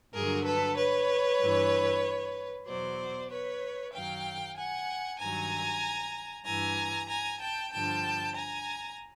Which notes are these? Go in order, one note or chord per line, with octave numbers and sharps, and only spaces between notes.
G2 D3 F#3 G#4 A#4
A4 B4
B4 C#5
G2 E3
E2 B2 F#3 C5 D5
B4 C#5
F#2 D#3 F#3 F5 G5
F#5 G#5
G2 D#3 F#3 G#5 A#5
G2 E3 G#5 A#5
G#5 A#5
G5 A5
G2 D3 F3 G5 A5
G#5 A#5